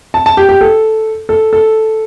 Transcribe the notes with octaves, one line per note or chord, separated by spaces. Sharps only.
A5
A5
G4
G4
A4
A4
A4